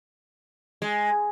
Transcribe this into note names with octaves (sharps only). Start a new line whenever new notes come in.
G#3